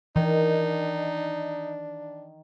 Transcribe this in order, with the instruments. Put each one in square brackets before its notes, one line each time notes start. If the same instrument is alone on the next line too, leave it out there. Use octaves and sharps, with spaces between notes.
[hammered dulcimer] D#3 [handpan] E3 [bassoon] D4 [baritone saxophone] D#4